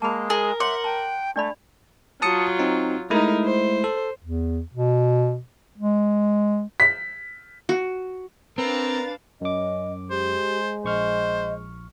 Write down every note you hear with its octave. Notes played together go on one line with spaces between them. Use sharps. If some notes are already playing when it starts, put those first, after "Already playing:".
G#3 A#3 A5 B5
G#4 A#4
C#5 E5 F#5 C6 D6
G5 A5
A3 D4 D5 B5
F#3 F4 A5 D#6 C#7
C4 D#4
G#3 A3 D#4 E4 A#4
C5
A4
E2
B2
G#3
B6
F#4
C4 D4 A#4 B4 F5 A6
F#2 C#4 D#5 D6
G#3 G4 C5
A#1 C5 D#5 C#6 F6